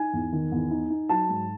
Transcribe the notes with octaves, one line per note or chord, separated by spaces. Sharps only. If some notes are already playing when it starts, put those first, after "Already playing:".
Already playing: D#4 G#5
E2
D#3
E2
D#4
D#4
F#3 A5
G#2